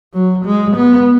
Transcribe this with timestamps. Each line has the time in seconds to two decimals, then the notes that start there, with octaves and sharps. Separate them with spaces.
0.14 F#3
0.45 G#3
0.76 B3